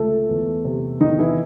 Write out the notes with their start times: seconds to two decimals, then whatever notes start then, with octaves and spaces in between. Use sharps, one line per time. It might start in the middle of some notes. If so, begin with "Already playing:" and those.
Already playing: C#2 A3 A4
0.29 E2
0.65 C3
1.00 E2 D#3 D#4
1.19 E3 E4